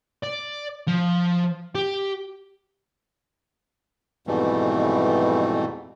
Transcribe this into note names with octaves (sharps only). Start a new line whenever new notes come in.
D5
F3
G4
F2 G#2 B2 E3 G3 A3